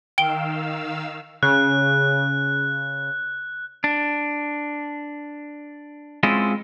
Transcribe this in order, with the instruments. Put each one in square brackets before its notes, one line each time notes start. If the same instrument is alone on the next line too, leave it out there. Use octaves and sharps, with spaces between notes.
[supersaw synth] D#3 F5 E6 [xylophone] G5 D7 G7
[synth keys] C#3 [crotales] F#6
[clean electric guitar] D4
G#3 C4 C#4 E4 F4 D#5